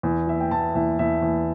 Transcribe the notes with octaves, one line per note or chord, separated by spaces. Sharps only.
E2
E3 E5
G5
E2 A5
E2 E5
E2 E5
E2